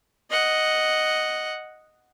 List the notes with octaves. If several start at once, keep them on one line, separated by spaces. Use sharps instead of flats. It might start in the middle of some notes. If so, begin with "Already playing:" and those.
D#5 F#5